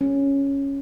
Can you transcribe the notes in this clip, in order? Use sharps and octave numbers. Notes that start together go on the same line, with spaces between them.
C#4